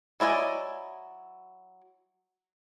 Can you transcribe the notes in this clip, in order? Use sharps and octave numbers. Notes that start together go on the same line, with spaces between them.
F#3 E4 D5 D#5 G#5